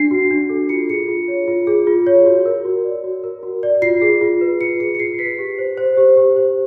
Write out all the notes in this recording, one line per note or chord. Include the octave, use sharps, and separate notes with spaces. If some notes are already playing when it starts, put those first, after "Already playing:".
Already playing: D4 C7
F#4
D4
A4
F4 C#7
G#4 C#7
F4
C#5
F4
G#4
F4
C#5
F#4
A#4
F#4
D5
F#4
A#4
F#4
D5
F4 C7
G#4
F4
B4
F4 C#7
G#4 C#7
C#7
F4 C7
B4 B6
G4
C5
C5
G4
G4
C5